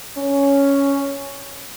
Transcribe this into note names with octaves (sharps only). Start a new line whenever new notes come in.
C#4